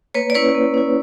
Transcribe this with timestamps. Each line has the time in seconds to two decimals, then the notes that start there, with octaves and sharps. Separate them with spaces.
0.14 A#3 B4 C#5
0.30 D5
0.35 C#4 E4 B4 C#5
0.55 A#3
0.74 C#4 E4